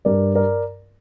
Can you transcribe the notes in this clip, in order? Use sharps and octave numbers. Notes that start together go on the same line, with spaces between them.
G2 A#4 D5
A#4 D5